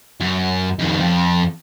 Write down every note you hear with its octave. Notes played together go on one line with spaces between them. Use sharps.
F#2
F2 D#3
F2